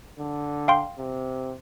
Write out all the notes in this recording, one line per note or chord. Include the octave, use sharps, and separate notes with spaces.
D3
F5 G5 C6
C3